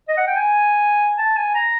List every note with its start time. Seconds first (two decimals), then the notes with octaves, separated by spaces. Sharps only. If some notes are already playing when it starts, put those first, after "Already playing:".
0.08 D#5
0.17 F#5
0.27 G5
0.36 G#5
1.18 A5
1.37 G#5
1.54 A#5